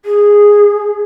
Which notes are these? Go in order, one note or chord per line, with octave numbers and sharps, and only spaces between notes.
G#4